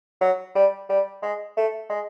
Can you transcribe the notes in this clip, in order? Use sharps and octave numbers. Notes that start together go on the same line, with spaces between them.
F#3
G3
G3
G#3
A3
G#3